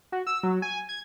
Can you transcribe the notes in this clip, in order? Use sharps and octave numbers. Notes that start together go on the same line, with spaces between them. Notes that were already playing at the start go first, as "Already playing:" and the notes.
F#4
E6
F#3
G#5
G#6